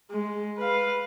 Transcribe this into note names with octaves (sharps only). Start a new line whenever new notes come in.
G#3
B4 F5